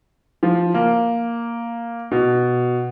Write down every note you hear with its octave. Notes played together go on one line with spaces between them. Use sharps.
F3
A#3
B2